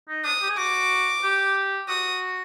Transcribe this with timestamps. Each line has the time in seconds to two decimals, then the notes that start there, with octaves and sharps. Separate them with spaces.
0.09 D#4
0.24 D4 D#6
0.42 G4
0.49 G#4
0.57 F#4 D6
1.24 G4
1.88 F#4 D#6